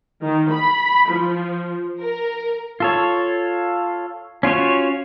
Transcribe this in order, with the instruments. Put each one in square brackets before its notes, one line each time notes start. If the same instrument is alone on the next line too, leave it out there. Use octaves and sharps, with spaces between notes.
[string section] D#3
B5
F3
A#4
[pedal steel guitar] F4 A4 C#5
C#4 F4 F#4 C#5